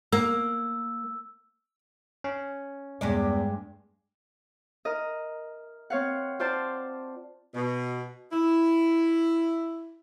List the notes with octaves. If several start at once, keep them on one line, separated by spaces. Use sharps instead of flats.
A#3 E6
C#4
E2 G2 G#3 D5
A#4 D#5
C4 C#5 F5 F#5
F4 C5 D5 A5
B2
E4